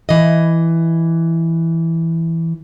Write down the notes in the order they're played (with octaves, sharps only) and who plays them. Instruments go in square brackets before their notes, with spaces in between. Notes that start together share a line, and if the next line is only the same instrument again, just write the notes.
[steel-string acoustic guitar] E3 D#5